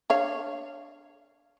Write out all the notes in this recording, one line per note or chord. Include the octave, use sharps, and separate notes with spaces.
D4 C#5 F5